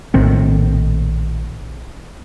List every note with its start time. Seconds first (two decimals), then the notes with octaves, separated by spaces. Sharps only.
0.14 A#1 A2 D#3 C4